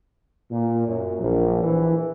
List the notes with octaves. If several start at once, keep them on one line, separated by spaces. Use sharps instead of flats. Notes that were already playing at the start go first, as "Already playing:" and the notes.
A#2
F#2
A#1
E3